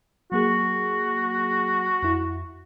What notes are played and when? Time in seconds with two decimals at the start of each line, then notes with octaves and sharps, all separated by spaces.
0.32 F#3 A#3 F#4 G#4
2.03 F2 E4